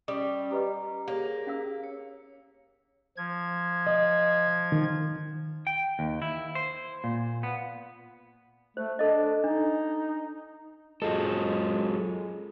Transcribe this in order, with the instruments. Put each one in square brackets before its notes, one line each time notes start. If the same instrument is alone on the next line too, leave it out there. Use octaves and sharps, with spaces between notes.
[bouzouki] G3 [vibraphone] C#4 [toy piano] D#6
[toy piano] G4 B4 D#5 [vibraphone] A#5
[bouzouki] A#3 [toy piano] G4 C#5 [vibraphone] G#4
[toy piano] C#4 F5 E6
[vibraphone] C#5
[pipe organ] F3 G#6
[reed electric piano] D#5
D#3
[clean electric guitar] G5
D#2
E4
C5
A#2
B3
[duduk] A3 [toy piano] C5
[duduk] D4 [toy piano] A4 D#5
[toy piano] D4 [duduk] D#4
[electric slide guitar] F#3 F4 A4 [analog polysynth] G#3